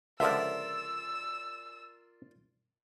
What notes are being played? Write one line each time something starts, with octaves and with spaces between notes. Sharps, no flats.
C#2 D3 F3 F4 A#4 D5 E5 E6